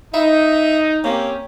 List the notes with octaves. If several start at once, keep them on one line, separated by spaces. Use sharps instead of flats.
D#4 E5
A#3 C4 C#4 G4